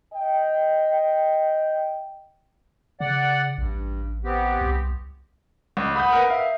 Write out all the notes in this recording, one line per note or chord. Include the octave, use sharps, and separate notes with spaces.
D#5 G5
C#3 D5 F#5
A1 G2
B3 C4 G4
C2
C#2
F#5 B5 D#6 G6
A#4 B4
E5 F5